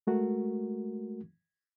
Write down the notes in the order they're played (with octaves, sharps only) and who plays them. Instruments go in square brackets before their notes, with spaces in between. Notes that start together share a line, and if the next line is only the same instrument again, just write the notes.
[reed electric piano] G#3 A3 F#4 A#4